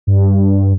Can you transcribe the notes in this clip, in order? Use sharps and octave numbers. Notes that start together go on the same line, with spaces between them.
G2